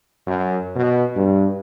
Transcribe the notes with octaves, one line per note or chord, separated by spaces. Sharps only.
F#2
B2
G2